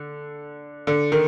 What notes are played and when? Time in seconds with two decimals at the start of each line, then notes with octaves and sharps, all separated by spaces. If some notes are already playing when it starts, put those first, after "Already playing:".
Already playing: D3
0.87 D3
1.12 D#3